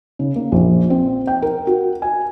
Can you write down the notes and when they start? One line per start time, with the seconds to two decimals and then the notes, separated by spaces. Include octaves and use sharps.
0.19 C#3
0.36 A#3
0.52 A#1
0.90 C4
1.27 G5
1.42 A#4
1.67 F#4
2.02 G#5